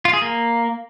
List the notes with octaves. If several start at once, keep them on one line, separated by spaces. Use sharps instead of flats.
F4
G#4
A#3